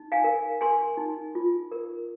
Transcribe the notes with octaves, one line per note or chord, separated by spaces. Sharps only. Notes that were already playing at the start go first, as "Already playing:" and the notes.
Already playing: D#4
F5 G#5
A#4
A#4 G#5 C6
D#4
F4
A#4